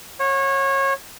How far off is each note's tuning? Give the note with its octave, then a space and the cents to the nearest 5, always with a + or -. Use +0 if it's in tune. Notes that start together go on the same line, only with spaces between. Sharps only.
C#5 -25 F#5 -25